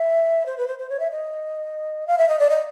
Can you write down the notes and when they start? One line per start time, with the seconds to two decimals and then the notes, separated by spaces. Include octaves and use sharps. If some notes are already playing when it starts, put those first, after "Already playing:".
Already playing: E5
0.46 C5
0.58 B4
0.67 C5
0.79 C5
0.90 C#5
1.00 E5
1.11 D#5
2.07 F5
2.18 E5
2.29 D#5
2.39 D5
2.50 D#5